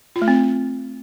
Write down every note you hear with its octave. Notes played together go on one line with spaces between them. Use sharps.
F4
A3
C4